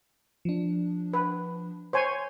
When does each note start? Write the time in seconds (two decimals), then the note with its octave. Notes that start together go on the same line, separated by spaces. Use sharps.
0.45 F3 D4
1.13 B4
1.93 C5 C#5 G#5